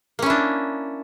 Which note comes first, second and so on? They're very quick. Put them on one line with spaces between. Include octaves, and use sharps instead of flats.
A#3 C#4 E4 D4